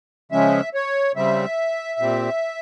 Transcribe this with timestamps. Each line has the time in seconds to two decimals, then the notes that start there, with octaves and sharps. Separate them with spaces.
0.32 C#3 F3 G#3 C#4 E5
0.74 C#5
1.16 C#3 G3 C4 E5
1.99 A#2 G3 C4